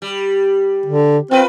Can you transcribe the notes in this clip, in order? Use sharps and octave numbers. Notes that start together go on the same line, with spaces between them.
G3
D3
C4 F4 A#4 B4